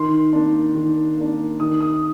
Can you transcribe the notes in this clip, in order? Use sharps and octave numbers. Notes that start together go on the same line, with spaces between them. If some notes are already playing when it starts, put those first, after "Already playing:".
Already playing: D#3 C6
A#3 D4
D#3
A#3 D4
D#3 D#6
D#6